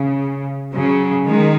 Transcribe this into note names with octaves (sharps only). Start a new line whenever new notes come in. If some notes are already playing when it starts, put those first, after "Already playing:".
Already playing: C#3
C#3 F#3
D#3 G#3